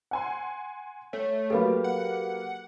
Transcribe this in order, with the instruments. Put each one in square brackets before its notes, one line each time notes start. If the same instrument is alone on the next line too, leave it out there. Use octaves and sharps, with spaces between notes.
[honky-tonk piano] F#5 G#5 C6
[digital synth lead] A3 [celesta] C#5
[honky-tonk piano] F#3 A#3 G4 [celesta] A4 B4 B5
[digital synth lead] F#5